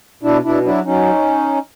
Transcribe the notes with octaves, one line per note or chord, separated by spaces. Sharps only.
B2 D4 E4
B2 D4 E4
F#3 D4 E4
F#3 C#4 D#4